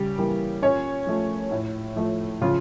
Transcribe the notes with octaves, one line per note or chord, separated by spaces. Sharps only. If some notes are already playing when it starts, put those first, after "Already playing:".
Already playing: C#3 G3 G4
E3 G3 A#3
A#2 C#4 C#5
F3 A3
A2
F3 A3
C#3 F3 F4